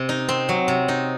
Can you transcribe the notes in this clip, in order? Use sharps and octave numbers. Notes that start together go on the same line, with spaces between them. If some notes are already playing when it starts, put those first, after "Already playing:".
Already playing: C3
D#4
C4
F#3
C3
D#4